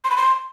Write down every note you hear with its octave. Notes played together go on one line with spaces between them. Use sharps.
C6
B5
C6